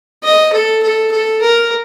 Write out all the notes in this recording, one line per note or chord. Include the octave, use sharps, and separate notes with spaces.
D#5
A4
A4
A4
A#4